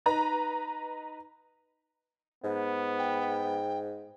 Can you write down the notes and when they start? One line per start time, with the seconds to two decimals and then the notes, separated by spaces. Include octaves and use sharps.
0.06 D#4 B4 A#5
2.43 G#2 B3
2.98 G5